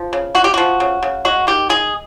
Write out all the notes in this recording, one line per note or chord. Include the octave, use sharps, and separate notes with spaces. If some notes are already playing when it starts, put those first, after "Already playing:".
Already playing: F3
C#3
G#3 F#4
G4
F3 F#4
C#3
C#3
G#3 F#4
D#3 G4
G#3 G#4